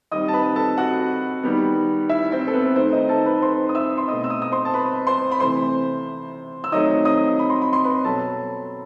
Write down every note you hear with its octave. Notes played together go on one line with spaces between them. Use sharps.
D#3 G3 C4 D#5 D#6
A5
B4 B5
A4 A5
F#4 F#5
D#3 G3 B3
E4 E5
C4 C5
A4
B3 B4
D#3 A3 C4 C5
D#4 D#5
A4 A5
B4 B5
C5 C6
D#6
E5 E6
C6
B2 A3 C4 D#5 D#6
E6
D#5 D#6
D#6
C5 C6
A5
B4 B5
C5 C6
B5
C3 E3 A3 C5 C6
E6
D#3 F#3 A3 C4 D#5 D#6
D#5 D#6
B5
C6
B5
C6
B4 B5
B2 F#3 C4 A4 A5